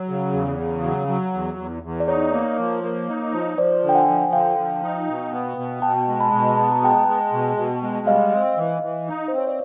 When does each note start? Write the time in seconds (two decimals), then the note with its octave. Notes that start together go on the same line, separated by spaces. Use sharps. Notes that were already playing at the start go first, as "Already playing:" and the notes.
Already playing: F#3 C#5
0.09 C#3
0.33 E2
0.58 C#3
0.83 F#3
1.08 F#3
1.33 E2
1.57 E2
1.83 E2
2.00 D5
2.08 D#4 C#5
2.32 A#3
2.58 F3
2.84 A#3
3.09 D#4
3.33 F3
3.58 F3 C5 D5
3.83 D3
3.89 G5
3.95 F#5 G#5
4.08 F3
4.32 D3 F5 G5
4.58 F3
4.83 D#4
5.08 B2
5.32 B3
5.57 B2
5.82 B2 G5 A5
6.08 G#3
6.20 A5 B5
6.33 B2
6.57 B3 A5
6.72 A#5
6.82 G#3 G5 A5
7.08 G#3
7.32 B2
7.57 B2
7.82 G#3
8.07 G3 D#5 F5
8.33 C4
8.57 E3
8.83 E3
9.08 D#4
9.28 C5
9.33 C4
9.38 C#5
9.47 D5